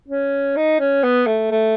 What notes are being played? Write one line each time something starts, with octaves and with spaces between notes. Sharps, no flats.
C#4
D#4
C#4
B3
A3
A3